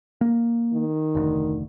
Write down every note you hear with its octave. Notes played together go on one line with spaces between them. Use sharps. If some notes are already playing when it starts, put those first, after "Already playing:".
A#3
D#3
F1 D2